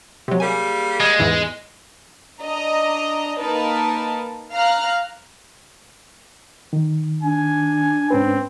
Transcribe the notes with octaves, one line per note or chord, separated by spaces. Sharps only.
C3 F#3
G3 A#3 G#4 G#5
G#3
E2 G#2 E3
D4 D#5 A#5
A#3 D#4 A#4 B4 A5
F5 A#5 F6 F#6
D#3
D4 G#5
G#2 C4 C#4 B4